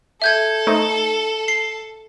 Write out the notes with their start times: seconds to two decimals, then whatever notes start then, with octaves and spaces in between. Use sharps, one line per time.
0.22 A4 E5 G6 G#6
0.67 A3 D#4 C5
1.48 C7